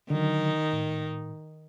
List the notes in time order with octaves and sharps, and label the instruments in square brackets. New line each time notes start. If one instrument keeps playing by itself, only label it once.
[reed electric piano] D3 F#3 [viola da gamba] D#3 D#4
[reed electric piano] A2